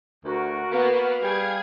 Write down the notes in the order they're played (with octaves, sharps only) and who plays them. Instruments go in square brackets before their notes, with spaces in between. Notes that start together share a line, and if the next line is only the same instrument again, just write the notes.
[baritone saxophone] D2 [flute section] F#4 A#4
[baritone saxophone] A#3 [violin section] B3 [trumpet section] F5
[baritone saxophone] G3 [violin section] G#4 G#6